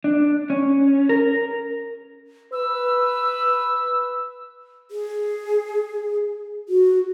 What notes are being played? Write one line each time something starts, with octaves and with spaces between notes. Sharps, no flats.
D4
C#4
A#4
B4 E6
G#4
F#4